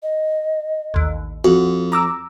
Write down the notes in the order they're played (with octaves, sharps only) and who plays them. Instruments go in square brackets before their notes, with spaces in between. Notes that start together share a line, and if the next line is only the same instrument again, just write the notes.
[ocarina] D#5
[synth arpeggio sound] A1 D#2
[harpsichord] F2 [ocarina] F4 [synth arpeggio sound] F#4
[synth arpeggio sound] A#5 D6 E6